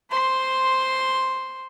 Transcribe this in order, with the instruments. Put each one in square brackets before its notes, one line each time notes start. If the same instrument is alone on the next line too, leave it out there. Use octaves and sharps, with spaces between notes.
[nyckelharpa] C5 C6